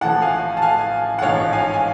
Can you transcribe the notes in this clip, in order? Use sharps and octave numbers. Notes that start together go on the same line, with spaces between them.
A1 A2 F3 F#5 A5
F5 G#5
A5
F5 G#5
F#5
A1 G#2 F3 C#5 F5
F5 G#5
G#5